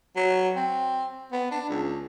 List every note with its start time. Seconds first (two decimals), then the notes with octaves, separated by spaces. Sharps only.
0.16 F#3
0.56 C4
1.32 B3
1.51 D4
1.70 C#2